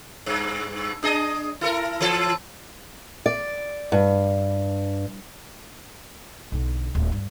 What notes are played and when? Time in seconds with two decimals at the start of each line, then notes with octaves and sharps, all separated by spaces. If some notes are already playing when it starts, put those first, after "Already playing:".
0.26 G2
1.03 D4 G#4 D#5
1.61 E4 A4 A#4
2.01 E3 A4
3.26 D5
3.92 G2
6.52 B1 D3
6.95 D1
7.12 G2